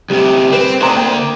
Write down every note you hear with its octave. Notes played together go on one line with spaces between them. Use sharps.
D2 C3 G3
C4 B4
D2 D3 C4 A#5 C6
A#3 G5